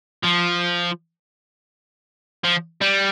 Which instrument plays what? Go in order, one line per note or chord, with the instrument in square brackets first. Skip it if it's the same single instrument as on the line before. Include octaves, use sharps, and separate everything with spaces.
[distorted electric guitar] F3
F3
G3